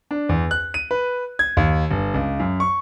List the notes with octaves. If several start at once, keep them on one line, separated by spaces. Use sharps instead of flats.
D4
E2
F#6
D#7
B4
G#6
D#2
G1
C#2
F#2
C#6